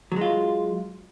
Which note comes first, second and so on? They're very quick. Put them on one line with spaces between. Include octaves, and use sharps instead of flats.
F#3 G#3 F4